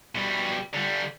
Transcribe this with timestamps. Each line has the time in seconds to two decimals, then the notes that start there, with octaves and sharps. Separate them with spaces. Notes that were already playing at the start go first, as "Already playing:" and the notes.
0.15 B2 G3
0.74 D3 G3